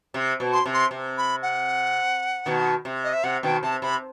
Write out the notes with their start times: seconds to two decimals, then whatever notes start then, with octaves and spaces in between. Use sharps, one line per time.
0.14 C3
0.40 B2
0.53 C6
0.65 C3
0.74 C6
0.91 C3
1.18 B5
1.42 F#5
2.46 B2 D#3
2.85 C3
3.04 D#5
3.13 E5
3.24 C3 F#5
3.43 B2 D#3 G5
3.63 C3 A5
3.82 C3 B5